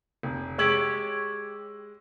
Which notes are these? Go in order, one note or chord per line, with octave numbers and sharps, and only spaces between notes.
F1
G#3 G4 C#5 E6 F#7